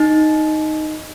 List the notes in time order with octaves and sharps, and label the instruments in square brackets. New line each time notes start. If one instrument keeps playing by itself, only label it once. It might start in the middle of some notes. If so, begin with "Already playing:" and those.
Already playing: [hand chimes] D#4